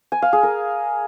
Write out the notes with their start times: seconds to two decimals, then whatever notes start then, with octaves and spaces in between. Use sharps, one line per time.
0.12 G#5
0.22 F5
0.33 G#4
0.43 A#4